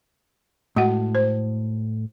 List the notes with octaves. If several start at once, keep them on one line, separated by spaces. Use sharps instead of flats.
A2 G#3 F#4 F#5
C5